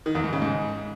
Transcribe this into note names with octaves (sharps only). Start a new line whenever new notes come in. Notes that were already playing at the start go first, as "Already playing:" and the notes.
D#3
E2
G#2
C#3
G#2